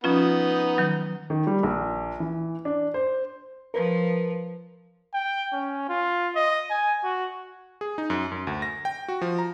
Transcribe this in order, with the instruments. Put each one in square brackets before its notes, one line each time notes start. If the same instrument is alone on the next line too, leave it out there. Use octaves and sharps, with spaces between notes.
[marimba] F3 C#4 F4 [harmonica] B3 D#4
[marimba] D#3 F#3
[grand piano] D#3
G3
A#1
E3
D4
C5
[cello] F3 [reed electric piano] A#4 B4
[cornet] G5
C#4
F4
D#5
G#5
F#4
[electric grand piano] G#4
D#4
F#2
F#2
D2
A#6
G5
F#4
F3
A#5